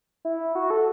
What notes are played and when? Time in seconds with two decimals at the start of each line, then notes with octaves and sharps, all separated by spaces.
0.25 E4
0.55 F#4
0.70 A4